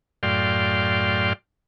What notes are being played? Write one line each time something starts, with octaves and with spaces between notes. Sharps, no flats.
F#2 A2 D5 F5 G5 C6